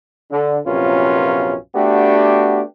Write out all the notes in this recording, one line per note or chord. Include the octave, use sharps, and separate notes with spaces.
D3
A#1 F#2 C3 C#4 F4 B4
A3 B3 D4 F#4 G4